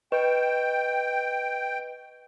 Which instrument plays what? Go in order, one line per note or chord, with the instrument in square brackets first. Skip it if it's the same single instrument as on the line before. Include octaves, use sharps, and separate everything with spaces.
[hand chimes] B4 D#5 C#6 [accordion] G5